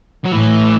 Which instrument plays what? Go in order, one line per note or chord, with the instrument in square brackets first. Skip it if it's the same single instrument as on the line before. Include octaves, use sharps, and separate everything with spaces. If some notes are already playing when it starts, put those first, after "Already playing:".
[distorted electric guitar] F#3
[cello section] A2 [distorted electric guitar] E3